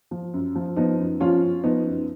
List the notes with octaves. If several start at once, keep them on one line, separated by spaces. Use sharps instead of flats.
F3
F#2
F3
F3 B3 D#4
F#2
F3 C#4 F4
F#2
F3 B3 D#4
F#2